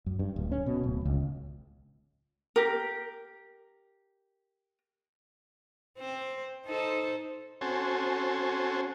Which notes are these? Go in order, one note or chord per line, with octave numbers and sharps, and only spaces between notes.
F#2
G2
D1
C#4
B2
D1
C#2
G4 A#4
C4 C5
D#4 A4 C5
C4 C#4 F#4 A4 C5 G#5